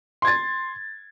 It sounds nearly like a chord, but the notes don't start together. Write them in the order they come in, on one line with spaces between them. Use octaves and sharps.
C6 G#6 A6